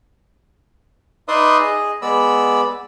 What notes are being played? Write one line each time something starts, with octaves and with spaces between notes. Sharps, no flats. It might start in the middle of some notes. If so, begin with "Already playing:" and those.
D#4 B4 D5 E5 C6 D#6
G#4 D#5
G#3 B3 D5 B5 E6